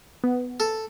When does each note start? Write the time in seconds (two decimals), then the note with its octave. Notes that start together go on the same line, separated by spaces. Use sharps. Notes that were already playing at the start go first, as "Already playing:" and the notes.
0.24 B3
0.60 A4